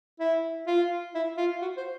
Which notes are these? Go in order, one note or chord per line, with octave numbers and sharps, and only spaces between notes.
E4
F4
E4
F4
F#4
C5